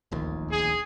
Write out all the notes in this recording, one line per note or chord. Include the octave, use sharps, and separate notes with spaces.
D1 A#1 D#2
G#4